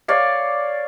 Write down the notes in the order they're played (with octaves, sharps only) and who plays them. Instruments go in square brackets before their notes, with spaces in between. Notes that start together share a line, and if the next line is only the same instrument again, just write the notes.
[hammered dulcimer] C#5 D5 F5